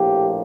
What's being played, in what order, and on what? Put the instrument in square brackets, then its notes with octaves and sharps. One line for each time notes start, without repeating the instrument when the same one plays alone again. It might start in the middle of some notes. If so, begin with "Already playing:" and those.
Already playing: [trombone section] A#1 A2 F3 A#3 G4